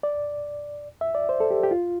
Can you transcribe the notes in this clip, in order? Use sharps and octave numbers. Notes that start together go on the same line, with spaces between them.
D5
E5
D5
C5
A4
G4
G4
F4